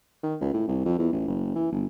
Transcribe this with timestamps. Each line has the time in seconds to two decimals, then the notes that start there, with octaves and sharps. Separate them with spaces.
0.23 D#3
0.41 C#2
0.54 A2
0.68 C2
0.85 F2
0.99 E2
1.13 A1
1.28 F#1
1.55 E3
1.72 G1